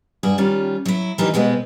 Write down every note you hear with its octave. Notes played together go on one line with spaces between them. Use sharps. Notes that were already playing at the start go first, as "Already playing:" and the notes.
G2 F#4 G#4
D#3 G3 C#4 F4
F#3 E4
E3 F#3 A#3 D4 D#4 G4
B2 G3 G#3 B3 C4